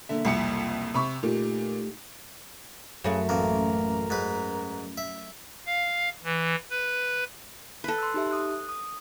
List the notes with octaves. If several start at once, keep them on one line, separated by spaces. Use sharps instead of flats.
B1 D3 A#3 E5
C2 F2 C#7
C3 B5 C#6
A#2 A3 D#4 G4
F#2 C#3 A3
A1 A#3 A#4
G#2 B4
E5
F5
E3
B4
A4 B4
C6 E6
D#4 G4 E5
D#6 F#6
D#6